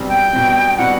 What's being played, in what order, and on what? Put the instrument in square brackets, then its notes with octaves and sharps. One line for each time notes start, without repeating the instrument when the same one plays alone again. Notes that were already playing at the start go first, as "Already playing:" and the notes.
Already playing: [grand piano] B2 G3 C4
[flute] G5
[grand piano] B2 G3 C4
[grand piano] B2 G3 C4 [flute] F#5